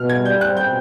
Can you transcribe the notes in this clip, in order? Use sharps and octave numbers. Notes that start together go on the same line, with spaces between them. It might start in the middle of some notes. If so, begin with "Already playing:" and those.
Already playing: B2 F6
G#6
G3
G6
C4 F#6
G6
B2